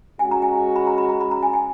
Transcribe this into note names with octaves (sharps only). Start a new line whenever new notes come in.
G#3 C#4 F#4 G#5
A#5
G#5
B5
A#5
B5
A#5
B5
A#5
G#5
G#5